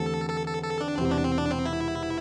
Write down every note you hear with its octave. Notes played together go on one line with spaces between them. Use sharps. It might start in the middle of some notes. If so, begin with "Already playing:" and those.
Already playing: E2 D3 A3 C4 G4 A4
A4
A4
A4
D4
E1 E2 C3 C4
D4
C4
D4
C4
E4